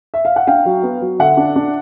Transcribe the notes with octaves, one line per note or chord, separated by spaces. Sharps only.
E5
F5
F#5
D4 F5 G5
F#3
B3
F#3
D3 E5 F#5
D4
D4